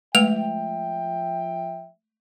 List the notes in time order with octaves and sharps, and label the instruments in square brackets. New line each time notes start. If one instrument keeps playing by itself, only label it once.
[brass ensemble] F3 E5 G5 [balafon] G#3 A3 B4 [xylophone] F7